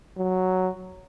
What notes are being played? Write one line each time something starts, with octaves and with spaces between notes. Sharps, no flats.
F#3